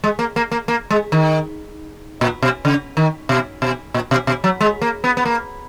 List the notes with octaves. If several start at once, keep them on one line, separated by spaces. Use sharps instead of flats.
G#3
A#3
A#3
A#3
A#3
G#3
D#3
A#2
B2
C#3
D#3
B2
B2
A#2
B2
B2
F#3
G#3
A#3
B3
B3
A#3